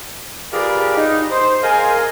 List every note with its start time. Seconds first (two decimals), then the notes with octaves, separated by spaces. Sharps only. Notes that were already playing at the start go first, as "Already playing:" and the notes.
0.53 F4 G4 G#4 A#4 B4 D5
0.97 D#4
1.31 C5
1.62 G#4 A#4 C5 D#5 F5 G#5